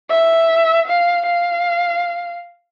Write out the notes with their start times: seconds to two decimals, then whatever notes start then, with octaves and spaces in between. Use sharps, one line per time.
0.10 E5
0.88 F5
1.26 F5